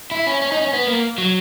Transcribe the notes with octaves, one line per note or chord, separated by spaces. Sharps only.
E4
C#4
C#4
D#4
C#4
B3
A#3
F#3